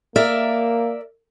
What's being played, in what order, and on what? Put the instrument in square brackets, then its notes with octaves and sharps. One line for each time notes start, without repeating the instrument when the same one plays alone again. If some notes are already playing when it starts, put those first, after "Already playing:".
[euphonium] A#3 [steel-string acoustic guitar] A#4 D5 E5